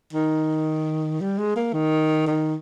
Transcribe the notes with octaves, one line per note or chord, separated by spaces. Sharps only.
D#3
G3
G#3
A#3
D#3
D#3